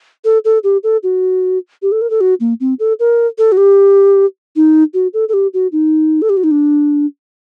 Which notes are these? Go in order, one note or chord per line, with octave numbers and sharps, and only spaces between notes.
A4
A4
G4
A4
F#4
G4
A4
A#4
A4
F#4
A#3
C4
A4
A#4
A4
F#4
G4
D#4
F#4
A4
A4
G4
F#4
D#4
A4
G4
F#4
D#4
D4